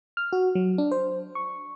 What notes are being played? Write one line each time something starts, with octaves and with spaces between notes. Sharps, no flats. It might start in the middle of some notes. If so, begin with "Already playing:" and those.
F6
F#4
F#3
D4
C5
C#6